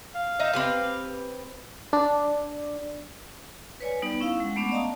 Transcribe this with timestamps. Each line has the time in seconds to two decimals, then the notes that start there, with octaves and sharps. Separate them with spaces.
0.15 F5
0.40 D#4 D#5 E5
0.53 C4 G4 B4
1.93 D4
3.81 B4 C#5 D5 G#5
4.02 G3 B3 D#4
4.20 C#4 E4 F5
4.40 G#3 F#5
4.56 A3 B3 C#4 D4 F#5
4.71 D5 D#5 F5 A5 A#5 D#6